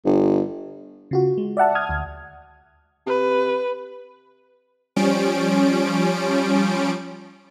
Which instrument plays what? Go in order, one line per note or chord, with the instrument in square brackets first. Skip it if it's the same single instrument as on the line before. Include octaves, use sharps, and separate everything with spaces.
[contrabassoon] G1
[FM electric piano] C#3 F4 F#4
G#3
D5 E5 F#5 A5
D#6 F6 G#6
D2
[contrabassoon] C3 [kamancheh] B4
[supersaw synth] F3 G3 C#4 D7